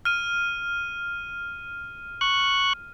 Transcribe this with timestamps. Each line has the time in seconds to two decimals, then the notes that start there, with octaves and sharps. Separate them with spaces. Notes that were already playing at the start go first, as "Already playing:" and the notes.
0.05 F6 D#7
2.21 C#6 F#6